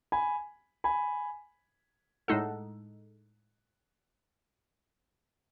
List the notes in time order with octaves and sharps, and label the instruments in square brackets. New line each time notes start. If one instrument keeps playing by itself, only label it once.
[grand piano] G#5 B5
G#5 B5
[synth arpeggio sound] A2 G#3 D#4 A4 [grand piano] F#5 A5